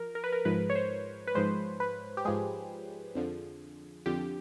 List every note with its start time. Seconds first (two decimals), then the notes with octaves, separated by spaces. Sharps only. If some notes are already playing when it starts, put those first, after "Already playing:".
Already playing: F3 A#4
0.15 A#4
0.24 B4
0.32 A#4
0.45 G#2 F3 G#3 B4
0.70 C#5
0.75 C5
1.27 B4
1.35 G#2 F3 G#3 C5
1.80 B4
2.17 G4
2.25 G#2 F3 G#3 G#4
3.15 F2 D3 F3
4.06 F2 D3 F3 G4